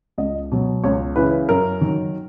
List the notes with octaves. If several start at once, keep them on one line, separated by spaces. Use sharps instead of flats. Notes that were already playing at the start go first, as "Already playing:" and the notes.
C#2 D#5
B2 F#3
C#2 C#5
C#3 E3 B4
F#2 A#4
D#3 F#3